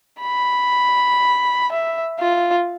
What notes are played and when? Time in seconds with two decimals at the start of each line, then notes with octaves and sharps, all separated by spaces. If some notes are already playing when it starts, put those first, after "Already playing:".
0.21 B5
1.72 E5
2.20 F4